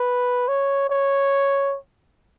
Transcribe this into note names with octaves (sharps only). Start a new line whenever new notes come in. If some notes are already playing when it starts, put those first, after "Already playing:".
Already playing: B4
C#5
C#5